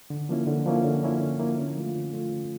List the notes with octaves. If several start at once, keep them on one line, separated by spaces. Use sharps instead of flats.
D3
F3 A#3 C#4 E4
D3
F3 A#3 C#4 E4
D3
F3 A#3 C#4 E4
D3
F3 A#3 C#4 E4
D3
F3 A3 C#4 F4
D3
F3 A3 C#4 F4
D3